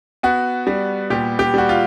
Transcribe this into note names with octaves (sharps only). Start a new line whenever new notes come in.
B3 F#4
G3
A#2 G4
G4
G3 F#4
F4